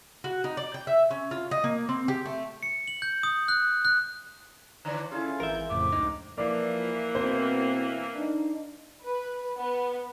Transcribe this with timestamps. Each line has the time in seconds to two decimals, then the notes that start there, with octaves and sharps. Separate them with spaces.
0.24 F#4
0.44 D#4
0.57 D5
0.74 G5
0.87 E5
1.11 C#4
1.31 F4
1.51 D#5
1.64 A#3
1.89 C4
2.08 G4
2.25 A3
2.63 C#7
2.88 F#7
3.02 G6
3.23 D#6
3.48 F#6
3.85 F#6
4.85 D3 E3 C#5 D5
5.12 C#4 E4 F4 G#4 A4
5.40 G#1 E3 A#4 E5 G6
5.70 F2 A2 C#3 F3 D6
5.92 C#2 F#2 D#4
6.38 E3 F3 A#3 D5
7.15 B2 C4 C5
8.16 D4 D#4
9.04 B4
9.57 B3